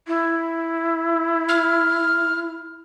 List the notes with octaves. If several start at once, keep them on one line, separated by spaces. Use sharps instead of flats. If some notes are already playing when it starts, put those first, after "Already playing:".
E4
F6